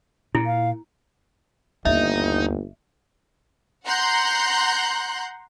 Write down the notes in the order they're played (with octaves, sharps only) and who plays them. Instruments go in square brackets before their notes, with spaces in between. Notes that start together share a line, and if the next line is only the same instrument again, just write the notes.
[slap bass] A#2 [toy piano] E4
[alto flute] F5
[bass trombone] G1 [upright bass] D#2 [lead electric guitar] D#4 [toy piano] D#5 E5
[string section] F#5 A#5 C6 F#6 G6